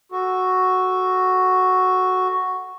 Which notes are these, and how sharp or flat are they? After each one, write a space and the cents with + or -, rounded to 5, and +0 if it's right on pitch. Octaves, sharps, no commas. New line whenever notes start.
F#4 +0 A4 +0